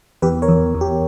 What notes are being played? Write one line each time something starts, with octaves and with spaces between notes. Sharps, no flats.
E2 G4 B4
A#4 C#5
E2
E2
G4